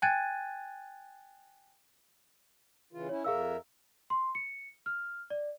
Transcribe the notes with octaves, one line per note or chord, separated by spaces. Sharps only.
G5 G#5 F#6 G#6 A6 D#7
C#3 E3 F4
C#4 E4 C#5
F2 G#4 A#4 E5 F5 E6
C6
C#7
F6
D5